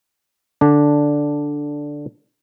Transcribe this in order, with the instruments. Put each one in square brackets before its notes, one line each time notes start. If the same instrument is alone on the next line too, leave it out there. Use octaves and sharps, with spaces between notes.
[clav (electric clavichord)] D3 D4